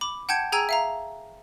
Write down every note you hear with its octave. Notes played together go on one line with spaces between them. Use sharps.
B5 D6
F#5 G5 A5 G6 G#6 C#7
G#4 G5 G#5 A#5 E6 G#6
E5 F5 A#5